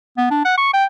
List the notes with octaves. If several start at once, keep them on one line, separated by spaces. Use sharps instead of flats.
B3
D4
F#5
C#6
G5